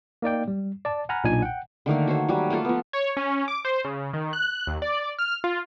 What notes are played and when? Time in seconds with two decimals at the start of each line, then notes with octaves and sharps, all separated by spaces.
0.22 A#3 D#4 D5 G5
0.48 G3
0.85 D5 A5
1.09 F#5 G#5 A#5 B5 F6 F#6
1.24 B1 A#2 D4 D#4 F4 G#5
1.42 F#5 G5
1.86 D3 D#3 A3 A#3
2.07 F#4 C5 C#5
2.28 F#3 G3 F#4
2.50 A3 A#3 F4 A4
2.65 F3 B3
2.93 C#5
3.17 C#4
3.48 D6
3.65 C5
3.85 C#3
4.13 D#3
4.33 F#6
4.67 D#2
4.82 D5
5.19 F6
5.44 F4